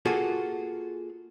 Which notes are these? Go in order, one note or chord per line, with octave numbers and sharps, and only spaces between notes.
A#3 F4 F#4 G#4 A4